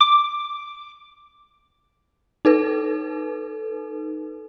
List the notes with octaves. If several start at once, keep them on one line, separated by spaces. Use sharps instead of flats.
D6
D#4 A4 B4